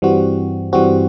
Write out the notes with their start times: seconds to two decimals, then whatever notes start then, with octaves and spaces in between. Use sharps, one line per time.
0.02 G2 E3 G3 C4 F#4
0.73 G2 E3 G3 C4 F#4